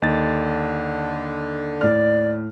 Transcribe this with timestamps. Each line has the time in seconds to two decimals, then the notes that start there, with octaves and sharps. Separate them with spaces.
0.02 D#2 D3 D#4 A6
1.81 A2 D5 F6